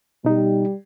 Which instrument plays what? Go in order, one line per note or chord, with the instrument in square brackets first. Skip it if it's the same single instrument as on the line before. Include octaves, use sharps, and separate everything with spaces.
[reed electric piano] B2 D#4 [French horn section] G3